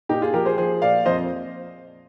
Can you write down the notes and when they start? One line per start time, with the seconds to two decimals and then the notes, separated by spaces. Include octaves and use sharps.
0.09 A#2 D#4 G4
0.22 F4 G#4
0.34 F3 G4 A#4
0.45 G#4 C5
0.58 F3 G#4 C5
0.82 A#2 D5 F5
1.06 F2 C5 D#5